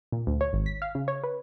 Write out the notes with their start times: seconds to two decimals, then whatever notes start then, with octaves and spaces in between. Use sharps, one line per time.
0.12 A#2
0.27 D2
0.41 C#5
0.53 G#1
0.66 B6
0.82 F5
0.95 C#3
1.08 C#5
1.23 B4